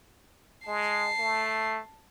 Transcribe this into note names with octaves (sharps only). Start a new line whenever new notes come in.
G#3 A5 C7
A3